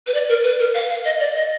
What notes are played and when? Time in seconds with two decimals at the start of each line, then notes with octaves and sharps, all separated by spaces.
0.07 B4
0.14 D5
0.29 A#4
0.44 B4
0.60 A#4
0.74 F5
0.90 F5
1.05 D#5
1.20 D5
1.36 D#5